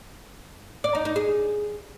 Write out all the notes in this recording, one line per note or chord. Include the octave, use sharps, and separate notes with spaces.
D5
D#4
D#4
G#4